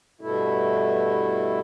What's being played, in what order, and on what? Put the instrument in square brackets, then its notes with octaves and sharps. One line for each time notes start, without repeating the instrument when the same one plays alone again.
[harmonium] G2 B2 A3 E4